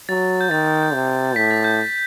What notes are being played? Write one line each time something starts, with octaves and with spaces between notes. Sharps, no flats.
F#3 A6
G6
D#3 A6
C3
A2 B6
A6
G6